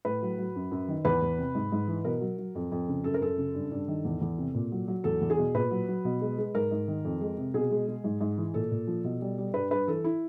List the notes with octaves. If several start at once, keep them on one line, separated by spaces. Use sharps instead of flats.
A2 B4
F#3
F#3
F#2
F#2
D#3
E2 B4
E2
C3
G#2
G#2
E3
B2 A#4
F#3
F#3
F2
F2
C#3
F#2 A4
A#4
F#2 A4
C#3
G2
G2
D#3
E2
E2
C3
A#2
F#3
F#3
E2 A4
E2
G#4
B2
A#2 B4
F#3
F#3
B2
G#3
G#3
G#2 A#4
G#2
D#3
F2
G#3
C3
B2 G#4
G#3
G#3
G#2
G#2
E3
A#2 A4
A#2
F3
B2
G3
G3
G2 B4
G2 B4
E3 A4
E4